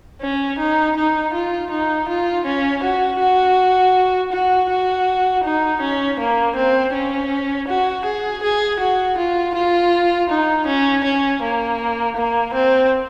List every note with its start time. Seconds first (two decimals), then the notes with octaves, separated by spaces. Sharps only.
0.22 C#4
0.59 D#4
0.97 D#4
1.33 F4
1.70 D#4
2.08 F4
2.46 C#4
2.83 F#4
3.20 F#4
4.32 F#4
4.70 F#4
5.44 D#4
5.82 C#4
6.20 A#3
6.56 C4
6.94 C#4
7.68 F#4
8.05 G#4
8.43 G#4
8.80 F#4
9.18 F4
9.55 F4
10.30 D#4
10.66 C#4
11.04 C#4
11.42 A#3
12.16 A#3
12.54 C4